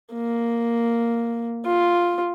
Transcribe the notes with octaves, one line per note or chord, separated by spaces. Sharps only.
A#3
F4